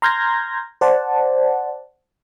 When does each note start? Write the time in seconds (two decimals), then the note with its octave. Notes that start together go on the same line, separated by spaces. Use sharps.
0.02 A#5 C6 F6 G6 G#6 A#6
0.81 C5 D5 F#5 A5